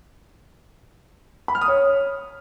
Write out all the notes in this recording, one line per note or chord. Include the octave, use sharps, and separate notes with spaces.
B5
F6
D#6
C#5